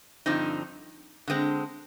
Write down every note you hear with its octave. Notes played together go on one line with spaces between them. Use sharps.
G2 D3 F3 C4 D#4
D3 G#3 C4